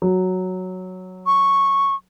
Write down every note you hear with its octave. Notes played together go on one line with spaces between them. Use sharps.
F#3
C#6